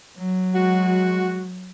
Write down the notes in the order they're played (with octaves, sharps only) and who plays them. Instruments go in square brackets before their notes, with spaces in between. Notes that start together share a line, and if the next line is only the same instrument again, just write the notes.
[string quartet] F#3
[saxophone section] G#3 F#4